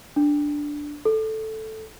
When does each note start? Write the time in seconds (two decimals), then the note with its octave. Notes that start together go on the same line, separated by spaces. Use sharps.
0.16 D4
1.05 A4